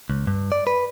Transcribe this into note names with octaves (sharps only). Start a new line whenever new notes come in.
C#2
G2
D5
B4